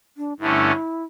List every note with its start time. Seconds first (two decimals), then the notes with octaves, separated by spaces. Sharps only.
0.17 D4
0.39 G2 D3 A3 C#4 E4